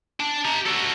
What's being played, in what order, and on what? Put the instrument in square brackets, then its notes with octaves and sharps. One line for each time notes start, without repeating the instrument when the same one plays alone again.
[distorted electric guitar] D4
G4 A#5
F#4 A4